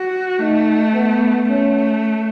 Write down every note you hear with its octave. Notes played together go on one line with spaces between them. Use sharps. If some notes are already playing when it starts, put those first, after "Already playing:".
Already playing: F#4
A3 D#4
B3
A3 C#4